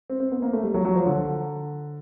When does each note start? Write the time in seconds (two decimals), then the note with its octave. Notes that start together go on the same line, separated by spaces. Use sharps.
0.10 C4
0.20 C4
0.32 B3
0.42 A#3
0.53 A3
0.63 G3
0.74 F#3
0.85 F#3
0.96 F3
1.06 D3